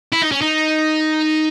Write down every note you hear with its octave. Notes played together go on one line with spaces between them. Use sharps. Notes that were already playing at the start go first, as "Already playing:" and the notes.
E4
D#4
C#4
D#4